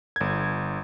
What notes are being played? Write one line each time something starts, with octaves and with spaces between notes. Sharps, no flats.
G1 G#6